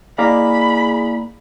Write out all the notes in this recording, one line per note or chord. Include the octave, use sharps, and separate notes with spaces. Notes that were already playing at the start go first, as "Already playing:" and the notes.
A#3 E4 G#4 D5 D#5 F5 A#5 B5